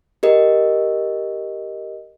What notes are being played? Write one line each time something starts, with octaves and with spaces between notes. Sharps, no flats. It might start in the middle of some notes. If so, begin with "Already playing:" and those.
G4 A#4 D#5